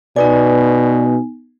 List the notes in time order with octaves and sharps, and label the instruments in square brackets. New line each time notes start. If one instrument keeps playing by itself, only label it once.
[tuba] B2 [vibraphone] B3 D#4 G#5 [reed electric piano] B4 D5